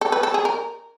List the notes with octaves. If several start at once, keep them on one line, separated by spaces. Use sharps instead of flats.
A4
B4
A4
G#4
A#4